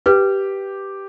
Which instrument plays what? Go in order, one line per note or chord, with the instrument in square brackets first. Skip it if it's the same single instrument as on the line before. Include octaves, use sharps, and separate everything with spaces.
[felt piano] G4 [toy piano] B4